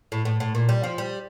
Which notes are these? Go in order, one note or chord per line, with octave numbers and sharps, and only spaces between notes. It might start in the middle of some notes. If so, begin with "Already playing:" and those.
A2
A2
A2
A#2
G3
F3
G3